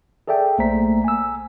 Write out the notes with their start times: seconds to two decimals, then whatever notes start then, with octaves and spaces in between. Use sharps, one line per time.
0.28 G#4 A4 D5 E5 G5
0.58 B1 A3 A#3 C5 A#5 B6
1.04 G#5 E6